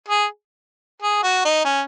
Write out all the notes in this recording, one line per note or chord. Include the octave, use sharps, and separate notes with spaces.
G#4
G#4
F#4
D#4
C#4